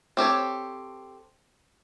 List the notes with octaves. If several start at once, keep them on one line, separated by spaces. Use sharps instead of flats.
C4 G4 A4 C#5